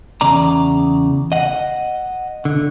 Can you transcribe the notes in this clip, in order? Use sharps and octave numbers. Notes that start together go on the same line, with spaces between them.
E2 C#3 D5 A#5
D#5 F#5
D3